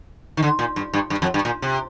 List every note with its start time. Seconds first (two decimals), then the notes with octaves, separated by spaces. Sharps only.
0.37 D#3
0.43 D3
0.59 A#2
0.76 G2
0.93 G2
1.10 G2
1.22 F2
1.34 G2
1.45 A#2
1.62 C3